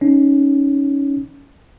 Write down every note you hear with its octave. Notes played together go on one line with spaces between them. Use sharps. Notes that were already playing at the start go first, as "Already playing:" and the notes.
C#4 D#4